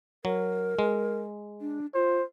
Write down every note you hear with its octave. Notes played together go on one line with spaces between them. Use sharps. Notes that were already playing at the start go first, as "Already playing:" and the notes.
F#3 A#4
G#3
D4
F4 C5